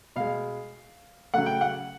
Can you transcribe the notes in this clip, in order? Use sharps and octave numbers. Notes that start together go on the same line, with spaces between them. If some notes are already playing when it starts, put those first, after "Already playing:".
B2 G#3 F5
C#3 F#3 A3 F#5
G5
F#5